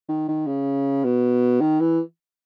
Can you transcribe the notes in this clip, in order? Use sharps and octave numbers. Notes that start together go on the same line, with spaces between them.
D#3
D#3
C#3
B2
D#3
E3